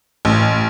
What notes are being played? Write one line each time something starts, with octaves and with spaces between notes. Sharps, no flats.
A1